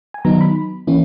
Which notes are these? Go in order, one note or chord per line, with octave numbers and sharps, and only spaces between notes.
G#5
D#3 F#3 B3 D#4 A#5
B5
E3 A#3 C#4 E4